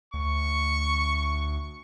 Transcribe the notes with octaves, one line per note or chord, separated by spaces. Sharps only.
D2 C#6